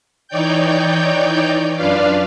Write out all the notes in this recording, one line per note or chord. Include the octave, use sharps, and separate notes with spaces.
E3 D#4 C#5 D5 G5 G6
F#2 D4 F4 B4 D5 F5